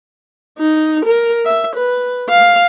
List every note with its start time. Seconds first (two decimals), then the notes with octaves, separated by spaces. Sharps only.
0.58 D#4
1.05 A#4
1.46 E5
1.76 B4
2.29 F5